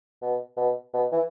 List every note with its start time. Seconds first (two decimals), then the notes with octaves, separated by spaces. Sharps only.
0.22 B2
0.57 B2
0.94 B2
1.12 E3